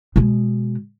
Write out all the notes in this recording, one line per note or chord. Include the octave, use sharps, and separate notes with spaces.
B2 G#3